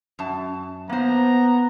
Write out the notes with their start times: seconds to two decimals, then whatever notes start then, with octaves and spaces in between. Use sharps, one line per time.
0.19 F#2 A5
0.89 A#3 B3 C5 A#5